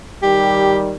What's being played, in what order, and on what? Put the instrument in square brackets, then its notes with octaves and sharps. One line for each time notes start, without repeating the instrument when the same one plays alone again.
[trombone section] D#3 G3 [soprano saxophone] G4